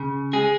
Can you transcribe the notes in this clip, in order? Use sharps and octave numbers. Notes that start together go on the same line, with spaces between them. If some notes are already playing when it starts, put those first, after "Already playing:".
Already playing: C#3
G#3 G#4